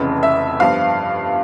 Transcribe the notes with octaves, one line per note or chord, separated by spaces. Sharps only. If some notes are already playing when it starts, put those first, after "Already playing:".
Already playing: F1 F2 C#3 E3
E5
G1 G2 F3 F5